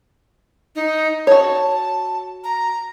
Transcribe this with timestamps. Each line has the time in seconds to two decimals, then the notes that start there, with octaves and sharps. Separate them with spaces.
0.75 D#4
1.27 F#4 C#5 A5
2.44 A#5